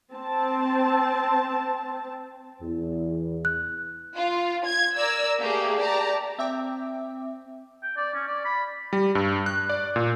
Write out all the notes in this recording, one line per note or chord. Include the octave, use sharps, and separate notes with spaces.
C4 A5
E2
F#6
F4
G#6
A#4 D5 E6
A3 A#3 G4 G#4
G4 D5 A5 A#5
C4 E5 G5 D6
G5
D5
C#4
D5
B5
G3
G2
F#6
D5
A#2